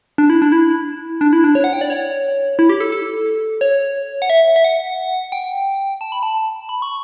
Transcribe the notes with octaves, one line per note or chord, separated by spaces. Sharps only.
D4
E4
D4
E4
D4
E4
D4
C#5
F#5
G5
D5
C#5
E4
G4
A4
A4
C#5
F#5
E5
E5
F#5
G5
A5
B5
A5
B5
C#6